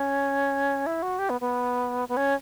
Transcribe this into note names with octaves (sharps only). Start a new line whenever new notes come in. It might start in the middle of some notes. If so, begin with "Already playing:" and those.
Already playing: C#4
E4
F#4
G4
B3
B3
B3
C#4